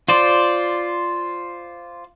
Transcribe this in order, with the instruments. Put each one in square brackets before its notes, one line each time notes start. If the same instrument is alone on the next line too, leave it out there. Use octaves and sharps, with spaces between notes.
[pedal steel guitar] F4 C5 D5